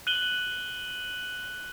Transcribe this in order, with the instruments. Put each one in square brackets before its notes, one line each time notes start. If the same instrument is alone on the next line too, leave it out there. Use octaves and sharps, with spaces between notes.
[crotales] F#6 D#7 F#7 G7